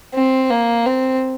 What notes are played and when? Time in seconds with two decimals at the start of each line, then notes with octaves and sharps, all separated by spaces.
0.14 C4
0.50 A#3
0.86 C4